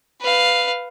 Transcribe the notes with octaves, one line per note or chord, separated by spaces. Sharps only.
B4 F5